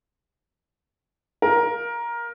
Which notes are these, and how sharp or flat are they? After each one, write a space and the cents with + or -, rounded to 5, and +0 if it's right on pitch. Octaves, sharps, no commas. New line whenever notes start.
A#4 +15 F5 +0